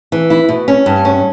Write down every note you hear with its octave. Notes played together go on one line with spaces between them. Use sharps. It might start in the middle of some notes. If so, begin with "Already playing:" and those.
E3
E4
B2
C#4
G2
C#4